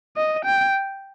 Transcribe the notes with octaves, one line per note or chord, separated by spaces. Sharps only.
D#5
G5